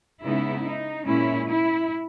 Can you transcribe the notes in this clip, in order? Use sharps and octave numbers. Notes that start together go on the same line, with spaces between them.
C#3 G#3 B3 D#4 E4
D#4
A#2 G#3 C#4 E4
E4